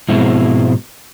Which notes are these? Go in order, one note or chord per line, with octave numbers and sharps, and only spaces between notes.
G#2 B2 F3 G#3 C4 E4